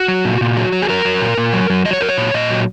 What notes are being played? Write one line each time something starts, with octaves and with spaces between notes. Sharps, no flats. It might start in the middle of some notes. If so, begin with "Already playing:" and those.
Already playing: F#4
F#3
A#2
A#2
F#3
F#3
G#4
F#3 A#4
F#3
A#2
A#2
F#3
F#3
F#3 D#5
C#5
F#3 A#4
C#5
A#2
A#2 D#5
F#3